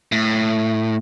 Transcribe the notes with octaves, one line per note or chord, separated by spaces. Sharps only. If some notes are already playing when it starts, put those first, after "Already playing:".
A2